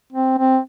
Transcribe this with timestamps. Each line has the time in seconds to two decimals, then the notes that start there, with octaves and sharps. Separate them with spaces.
0.12 C4
0.38 C4